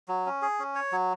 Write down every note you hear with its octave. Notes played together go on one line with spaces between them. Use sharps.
F#3
C#4
G#4
C#4
C#5
F#3